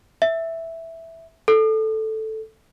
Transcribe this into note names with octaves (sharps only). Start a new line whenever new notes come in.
E5
A4